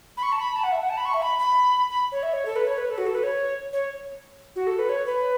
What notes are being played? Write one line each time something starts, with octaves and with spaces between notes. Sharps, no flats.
B5
C#6
A5
B5
A5
F#5
E5
F#5
A5
B5
C#6
E5
B5
B5
B5
C#5
E5
C#5
A4
B4
C#5
B4
A4
F#4
A4
B4
C#5
C#5
F#4
A4
B4
C#5
B4